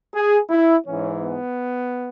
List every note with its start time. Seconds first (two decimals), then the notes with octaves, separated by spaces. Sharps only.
0.13 G#4
0.50 E4
0.86 G#2 E3 C#4
1.22 B3